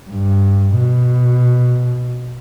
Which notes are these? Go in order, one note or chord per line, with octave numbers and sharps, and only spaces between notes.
G2
B2